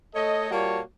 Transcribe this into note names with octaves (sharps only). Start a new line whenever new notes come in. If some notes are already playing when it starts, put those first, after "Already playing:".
A3 A4 C#5 D#5
A#2 G3 A#3 F#4 C#5 A5